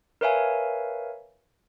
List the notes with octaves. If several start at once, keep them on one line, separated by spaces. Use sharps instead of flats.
A#4 B4 C#5 E5 F5 G#5